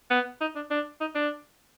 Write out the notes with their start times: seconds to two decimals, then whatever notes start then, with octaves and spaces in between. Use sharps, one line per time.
0.11 B3
0.41 D#4
0.56 D4
0.70 D4
1.00 D#4
1.15 D4